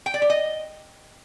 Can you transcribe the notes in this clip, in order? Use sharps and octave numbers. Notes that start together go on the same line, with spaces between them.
G5
D5
G4
D#5